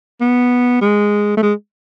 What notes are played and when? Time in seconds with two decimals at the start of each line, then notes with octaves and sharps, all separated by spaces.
0.21 B3
0.81 G#3
1.37 A3
1.43 G#3